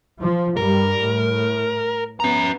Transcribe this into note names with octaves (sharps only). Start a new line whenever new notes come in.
F3
G2 G3 A#4
A2
B3 C#4 A#5